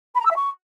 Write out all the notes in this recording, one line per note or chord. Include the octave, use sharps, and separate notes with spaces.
B5
A#5
E6
E5
C#6